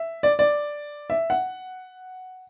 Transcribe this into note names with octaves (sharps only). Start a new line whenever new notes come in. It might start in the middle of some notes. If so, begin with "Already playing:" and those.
Already playing: E5
D5
D5
E5
F#5